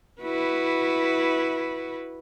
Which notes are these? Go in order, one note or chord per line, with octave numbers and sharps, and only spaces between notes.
E4 F#4 B4